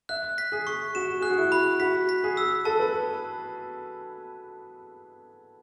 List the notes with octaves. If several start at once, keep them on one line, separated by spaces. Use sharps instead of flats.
E5 F#6
B6
G#4
C#6
F#4 E7
G#4 F#6
F#4
E4
B5
F#4 B6
B6
G#4
E6
A4 A5
B4